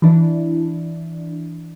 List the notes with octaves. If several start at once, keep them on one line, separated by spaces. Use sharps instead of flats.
E3 D4 E4